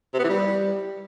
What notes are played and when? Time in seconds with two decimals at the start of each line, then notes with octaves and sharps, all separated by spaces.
0.14 C3
0.19 B3
0.24 E3
0.29 G3